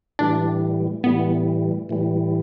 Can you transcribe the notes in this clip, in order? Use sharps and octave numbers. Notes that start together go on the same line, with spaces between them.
A2 E3 G3 D4
A2 E3 G3 B3
A2 E3 G3